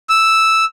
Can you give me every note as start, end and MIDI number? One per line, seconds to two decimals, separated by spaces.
0.09 0.65 88